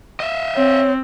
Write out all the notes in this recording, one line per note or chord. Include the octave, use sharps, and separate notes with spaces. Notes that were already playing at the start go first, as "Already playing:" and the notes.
D#5 E5
C4 C#5